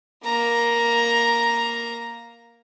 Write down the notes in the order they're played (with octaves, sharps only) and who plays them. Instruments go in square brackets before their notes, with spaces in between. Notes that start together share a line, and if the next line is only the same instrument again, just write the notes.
[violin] A#3 A#5